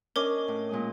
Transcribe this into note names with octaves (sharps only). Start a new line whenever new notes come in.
C#4 D4 A#4 C#5 D#5 D6
A2
A#2 G#3 D#6